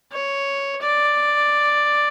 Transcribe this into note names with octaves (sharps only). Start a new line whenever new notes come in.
C#5
D5